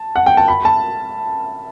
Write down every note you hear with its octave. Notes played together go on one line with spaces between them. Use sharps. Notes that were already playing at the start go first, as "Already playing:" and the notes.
Already playing: A5
F#5
G5
A5
B5
A5